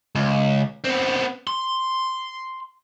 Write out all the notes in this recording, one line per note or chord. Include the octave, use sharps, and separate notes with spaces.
C#2
B3 C4
C6